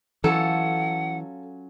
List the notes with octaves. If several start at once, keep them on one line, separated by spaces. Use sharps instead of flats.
E3 F#3 C#4 F4 A4 F#5